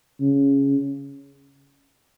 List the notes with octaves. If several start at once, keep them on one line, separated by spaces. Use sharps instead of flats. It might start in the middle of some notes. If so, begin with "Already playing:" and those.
C#3